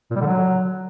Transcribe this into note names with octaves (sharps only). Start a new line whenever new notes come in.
A#2
G3
D3
F#3